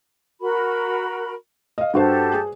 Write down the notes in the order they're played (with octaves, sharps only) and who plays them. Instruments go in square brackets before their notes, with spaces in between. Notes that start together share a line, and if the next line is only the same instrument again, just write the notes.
[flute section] F#4 A#4 B5
[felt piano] D#5 F5
[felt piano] G2 F#4 C5 [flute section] G4 A4 A5
[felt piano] G#4